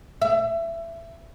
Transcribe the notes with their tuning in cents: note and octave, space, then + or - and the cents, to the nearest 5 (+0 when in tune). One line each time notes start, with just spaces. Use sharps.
E5 +20